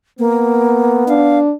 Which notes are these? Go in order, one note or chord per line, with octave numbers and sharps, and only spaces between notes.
A#3 B3
D4 F5